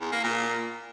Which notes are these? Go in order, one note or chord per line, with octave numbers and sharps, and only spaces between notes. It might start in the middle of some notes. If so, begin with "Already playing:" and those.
E2
A#3
A#2